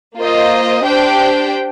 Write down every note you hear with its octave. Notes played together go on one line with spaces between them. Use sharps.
A#3 F4 C5 D#5
D4 G4 C5 G5